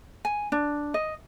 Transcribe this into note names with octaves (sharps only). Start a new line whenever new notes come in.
G#5
D4
D#5